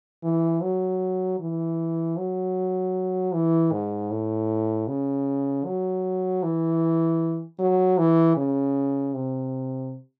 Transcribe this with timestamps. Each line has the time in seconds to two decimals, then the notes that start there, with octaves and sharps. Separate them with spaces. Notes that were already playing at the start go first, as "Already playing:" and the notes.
0.24 E3
0.62 F#3
1.40 E3
2.17 F#3
3.33 E3
3.72 G#2
4.11 A2
4.88 C#3
5.66 F#3
6.43 E3
7.59 F#3
7.98 E3
8.37 C#3
9.14 C3